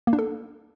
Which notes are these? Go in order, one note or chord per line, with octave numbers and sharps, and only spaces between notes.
A#3
D4
A4